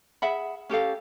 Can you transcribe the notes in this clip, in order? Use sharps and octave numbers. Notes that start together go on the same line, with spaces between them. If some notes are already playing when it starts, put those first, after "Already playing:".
G#4 E5 F#5 B5
C#4 G4 A4 F5